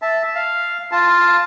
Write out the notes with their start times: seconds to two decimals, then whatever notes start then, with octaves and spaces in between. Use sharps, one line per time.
0.02 E5 A5
0.35 F5
0.92 F4 A5